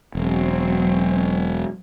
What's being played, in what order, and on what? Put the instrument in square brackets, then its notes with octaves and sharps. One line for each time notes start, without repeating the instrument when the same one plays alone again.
[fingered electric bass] E1 [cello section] F#3 C4